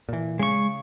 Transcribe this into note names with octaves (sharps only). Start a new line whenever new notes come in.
A#2 E3
C#3 G#3 C#6